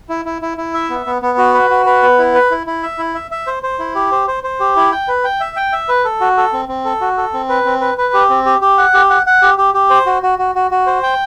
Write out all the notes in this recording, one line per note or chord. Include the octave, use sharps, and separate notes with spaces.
E4
E4
E4
E4
E5
B3
B3
B3
F#4
B4
F#4
B4
B3
E4
B4
E4
E4
E5
E4
E5
E5
C5
C5
E4
G4
C5
C5
C5
G4
E4
G5
B4
G5
E5
G5
E5
B4
A4
F#4
A4
C4
C4
A4
F#4
A4
C4
B4
C4
B4
B4
G4
C4
G4
G4
F#5
G4
F#5
F#5
G4
G4
G4
C5
F#4
F#4
F#4
F#4
F#4
C5
G5